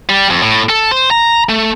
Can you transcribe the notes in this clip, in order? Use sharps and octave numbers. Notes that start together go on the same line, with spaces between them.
G3
F2
A2
A4
C5
A#5
A3